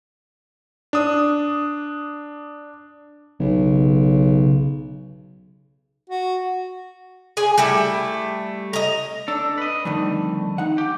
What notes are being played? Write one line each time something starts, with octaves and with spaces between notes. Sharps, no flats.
D4 D#6
B1 C#3
F#4
G#4 G#5
G3 A3 E4
D#5 A#5
D4 A4
B4 D#5
F2 D3 D#3 G3 A3
D#4 F#5
G4